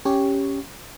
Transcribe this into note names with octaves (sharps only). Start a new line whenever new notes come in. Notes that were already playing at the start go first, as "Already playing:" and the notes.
C#4 G4 C#5